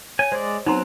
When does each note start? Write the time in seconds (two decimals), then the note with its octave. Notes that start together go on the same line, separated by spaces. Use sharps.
0.19 C#5 G#5
0.32 G#3 C5 D5
0.66 F#3 B3 C4 D#4 A#5 C6